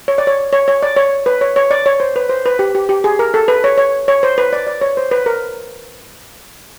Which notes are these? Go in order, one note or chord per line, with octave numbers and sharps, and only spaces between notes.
C#5
D5
C#5
C#5
C#5
D5
C#5
B4
C#5
C#5
D5
C#5
C5
B4
C5
B4
G4
G4
G4
G#4
A#4
A4
B4
C#5
C#5
C#5
C5
B4
D5
D5
C#5
C5
B4
A#4